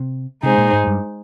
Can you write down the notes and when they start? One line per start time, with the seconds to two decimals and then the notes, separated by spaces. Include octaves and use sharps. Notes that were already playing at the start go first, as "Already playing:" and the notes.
Already playing: C3
0.43 C3 G#3 D#4 G#4 C5
0.58 A#2
0.73 G#2
0.87 G2